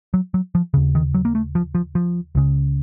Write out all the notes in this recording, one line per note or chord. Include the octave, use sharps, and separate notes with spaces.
F#3
F#3
F3
D#2 C#3
D#3
F#3
A#3
A3
F3
F3
F3
C#2 C#3